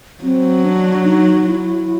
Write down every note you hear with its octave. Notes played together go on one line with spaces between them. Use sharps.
F#3 C4
D4
D#4
E4